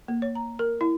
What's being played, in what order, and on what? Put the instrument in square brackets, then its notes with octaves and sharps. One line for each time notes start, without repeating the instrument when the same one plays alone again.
[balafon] A#3
C#5
A#5
A#4
E4